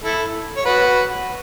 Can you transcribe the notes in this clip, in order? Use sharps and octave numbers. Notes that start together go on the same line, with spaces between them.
E4 A4
C#5
F#4 B4